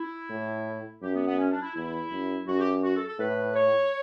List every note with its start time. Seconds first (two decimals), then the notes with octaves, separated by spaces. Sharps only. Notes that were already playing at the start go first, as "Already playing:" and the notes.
Already playing: E4
0.29 A2
1.02 F#2 G4
1.14 B3
1.26 B3
1.38 C#4
1.51 D4
1.62 E4
1.74 E2 E4
2.10 F#2
2.46 F#2 F#4
2.59 G4
2.83 F#4
2.96 A4
3.07 A4
3.19 A2 B4
3.56 C#5